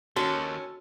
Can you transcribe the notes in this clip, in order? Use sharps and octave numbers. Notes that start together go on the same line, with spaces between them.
D#2 C#4 F#4 A4